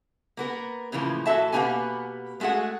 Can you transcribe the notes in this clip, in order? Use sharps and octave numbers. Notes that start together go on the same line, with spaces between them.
A#3 B3 A#4
A2 C#3 E3 F3 A#3
A2 F#4 A4 E5 A5
B2 A#3 B3 D#4 G4 G#5
G#3 A3 F#4 G#4 F#5